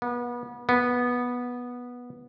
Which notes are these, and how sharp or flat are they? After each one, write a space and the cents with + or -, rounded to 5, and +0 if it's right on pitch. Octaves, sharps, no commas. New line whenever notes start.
B3 -30
B3 -10